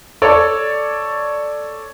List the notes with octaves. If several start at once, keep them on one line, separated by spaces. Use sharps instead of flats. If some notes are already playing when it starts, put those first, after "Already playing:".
A4 C#5 D5